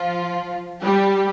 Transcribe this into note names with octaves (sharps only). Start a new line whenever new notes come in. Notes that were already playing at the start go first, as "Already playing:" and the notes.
Already playing: F3 F4
G3 G4